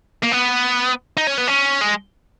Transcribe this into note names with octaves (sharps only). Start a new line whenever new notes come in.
A#3
B3
D#4
C#4
B3
C#4
G#3